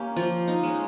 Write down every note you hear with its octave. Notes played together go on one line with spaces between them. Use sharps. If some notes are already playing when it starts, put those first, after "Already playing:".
Already playing: A#3 C#4 G4
F3 F4
D#4
G#3 C#4